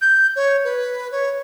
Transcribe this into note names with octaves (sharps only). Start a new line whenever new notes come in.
G6
C#5
B4
C#5